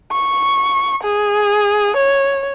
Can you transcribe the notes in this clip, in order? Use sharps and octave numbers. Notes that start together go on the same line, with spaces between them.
C#6
G#4
C#5